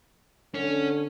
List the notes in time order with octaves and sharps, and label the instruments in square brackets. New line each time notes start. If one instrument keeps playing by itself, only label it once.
[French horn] D3 [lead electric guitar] C#4